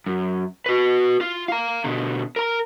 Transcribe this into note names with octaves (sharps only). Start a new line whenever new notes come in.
F#2
F#4 B4
F4
F5 A#5
B2 D3
A#4 A#5